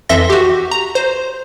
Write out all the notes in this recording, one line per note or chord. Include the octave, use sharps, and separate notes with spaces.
F2 E3 A4 E5 C6 A#6
F#4 G4
A#5
C5